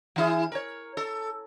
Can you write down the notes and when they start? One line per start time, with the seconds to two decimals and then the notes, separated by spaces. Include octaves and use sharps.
0.16 E3 E4 G#4
0.52 A#4 C#5
0.97 A4